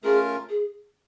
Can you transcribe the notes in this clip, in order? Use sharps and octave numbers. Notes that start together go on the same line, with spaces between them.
A3 C#4 F4 G#4 A#4
G#4